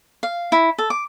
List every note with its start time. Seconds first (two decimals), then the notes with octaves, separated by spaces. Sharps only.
0.23 F5
0.52 E4
0.78 A4
0.90 D6